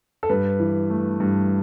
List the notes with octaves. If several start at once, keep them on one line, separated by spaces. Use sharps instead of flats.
A4
G2 B4
E3
A3
G2